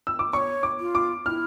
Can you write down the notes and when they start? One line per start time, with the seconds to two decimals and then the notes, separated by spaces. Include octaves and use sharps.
0.07 E6
0.19 D6
0.33 C#5 D5 C#6
0.63 D6
0.80 F4
0.95 D6
1.26 E4 F6